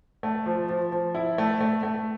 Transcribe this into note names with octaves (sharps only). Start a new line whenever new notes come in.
A3
F3
F3
F3
E4
A3
A3
A3